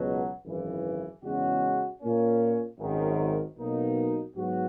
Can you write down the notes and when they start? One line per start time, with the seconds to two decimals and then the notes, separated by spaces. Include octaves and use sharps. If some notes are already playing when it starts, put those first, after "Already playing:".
Already playing: C#2 B2 F#3
0.45 G#1 F#2 C#3 E3
1.23 E2 C#3 G#3 C#4 F#4
2.01 A#2 A#3 C#4
2.80 G#1 F#2 D#3
3.57 B1 B2 F#3 A#3 D#4
4.36 G#2 F#3 B3 F#4